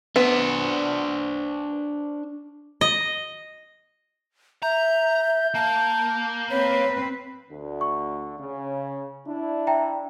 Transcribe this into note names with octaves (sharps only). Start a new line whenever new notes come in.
B3 D4 C5
D#5
E5 A#5 G6
A#3 A5
C4 B4 C#5
D2 D3
C#6
C#3
D4 E4
E5 G5 A#5